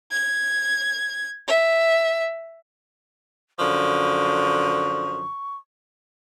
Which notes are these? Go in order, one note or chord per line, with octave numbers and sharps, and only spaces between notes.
G#6
E5
F#2 D3 F3 C#6